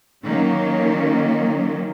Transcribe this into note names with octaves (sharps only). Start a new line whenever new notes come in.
D#3 F#3 A#3 C#4